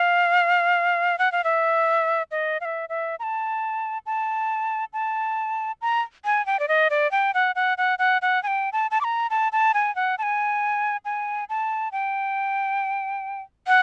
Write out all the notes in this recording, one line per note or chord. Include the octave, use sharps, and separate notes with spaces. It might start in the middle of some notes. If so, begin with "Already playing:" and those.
Already playing: F5
F#5
F5
E5
D#5
F5
E5
E5
A#5
A5
A5
A5
A#5
G#5
G5
D5
D#5
D5
G5
F#5
F#5
F#5
F#5
F#5
G#5
G5
A5
A5
D6
A#5
A5
A5
G#5
F#5
A5
G#5
G#5
A5
G5
F#5